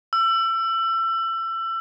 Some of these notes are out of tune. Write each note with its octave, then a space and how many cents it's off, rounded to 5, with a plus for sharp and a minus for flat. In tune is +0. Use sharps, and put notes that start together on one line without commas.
E6 +30